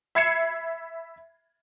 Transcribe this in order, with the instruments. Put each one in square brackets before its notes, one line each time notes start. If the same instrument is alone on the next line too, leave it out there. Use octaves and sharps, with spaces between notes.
[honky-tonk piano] E5 B5 G#6 C7 C#7 E7